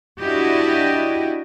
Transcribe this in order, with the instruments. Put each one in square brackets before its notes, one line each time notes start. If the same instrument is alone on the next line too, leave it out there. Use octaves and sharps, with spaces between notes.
[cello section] D4 E4 F#4 G4 D#5